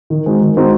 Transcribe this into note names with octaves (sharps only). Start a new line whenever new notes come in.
D#3
G#3 C4 D#4 F#4
D#3
G#3 C4 D#4 F#4